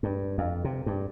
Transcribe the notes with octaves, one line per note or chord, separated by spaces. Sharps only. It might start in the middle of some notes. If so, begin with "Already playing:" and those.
G2
F2
C3
G2